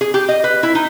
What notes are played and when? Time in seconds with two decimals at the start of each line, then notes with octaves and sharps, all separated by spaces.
0.01 G#4
0.14 G4
0.29 D#5
0.44 B4
0.63 E4
0.75 D#4